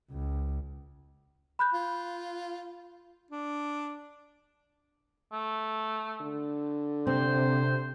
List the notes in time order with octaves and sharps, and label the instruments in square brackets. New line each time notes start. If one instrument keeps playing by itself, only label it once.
[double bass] C#2
[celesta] B5 F#6 G6
[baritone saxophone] F4
D4
[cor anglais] A3
[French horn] D3
[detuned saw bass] C3 [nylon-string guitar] C4 [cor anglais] C5